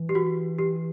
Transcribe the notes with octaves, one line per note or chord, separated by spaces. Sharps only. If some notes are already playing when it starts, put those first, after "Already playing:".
Already playing: E3
G4
F#4
G4